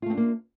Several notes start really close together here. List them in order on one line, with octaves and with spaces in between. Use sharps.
F4 A3 C4 D4 A#3